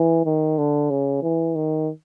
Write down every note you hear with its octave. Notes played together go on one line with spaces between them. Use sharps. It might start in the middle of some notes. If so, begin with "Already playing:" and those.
Already playing: E3
D#3
D3
C#3
E3
D#3